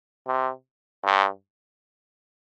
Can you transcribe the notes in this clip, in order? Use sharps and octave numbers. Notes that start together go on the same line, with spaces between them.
C3
G2